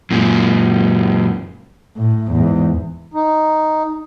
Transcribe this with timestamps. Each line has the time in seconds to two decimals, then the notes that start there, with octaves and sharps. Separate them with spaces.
0.11 F#2 A#2
1.97 A2
2.32 E2 G#2
3.14 D#4